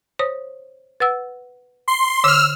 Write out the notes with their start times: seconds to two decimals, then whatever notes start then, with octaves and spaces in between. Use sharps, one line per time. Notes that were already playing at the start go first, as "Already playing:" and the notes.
0.19 C5 C#5 D#6
1.00 B4 F#5 E6
1.88 C6
2.24 D3 C#5 D6 E6 F6